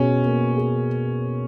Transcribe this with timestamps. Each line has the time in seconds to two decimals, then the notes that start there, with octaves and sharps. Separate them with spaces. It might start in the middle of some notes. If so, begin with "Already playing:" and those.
Already playing: B2 C#4 G#4
0.24 A#3
0.57 G#4